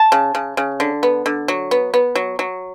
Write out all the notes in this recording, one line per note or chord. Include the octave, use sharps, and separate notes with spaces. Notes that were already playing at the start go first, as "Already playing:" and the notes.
Already playing: A5
C#3
C#3
C#3
D3
B3
D3
F#3
B3
B3
F#3
F#3